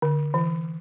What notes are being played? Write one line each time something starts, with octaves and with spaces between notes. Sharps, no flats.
D3
E3